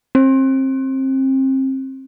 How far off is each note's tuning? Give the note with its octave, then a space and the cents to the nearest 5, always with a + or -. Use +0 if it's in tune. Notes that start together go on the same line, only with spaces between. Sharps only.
C4 +30